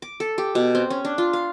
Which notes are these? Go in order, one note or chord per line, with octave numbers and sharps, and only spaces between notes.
D6
A4
G4
B2
C4
C#4
D4
F4
F5